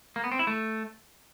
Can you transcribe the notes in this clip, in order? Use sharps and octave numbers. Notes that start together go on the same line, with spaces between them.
A#3
B3
C4
E4
A3